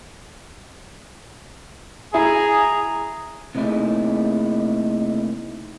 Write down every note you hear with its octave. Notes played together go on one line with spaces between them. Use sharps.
E4 G#4 A#5
C3 A3 A#3 D#4 E4 G#4